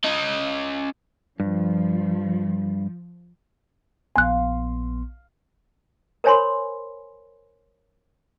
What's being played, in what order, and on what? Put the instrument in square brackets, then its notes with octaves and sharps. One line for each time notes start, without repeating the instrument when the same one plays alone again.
[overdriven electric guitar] C#4 D#5
[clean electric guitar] G2 [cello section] F3
[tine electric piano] A#1 B3 C6 [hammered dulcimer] F5 [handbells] G#5 F#6
[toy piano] A#4 C5 C#5 G#5 B5 C6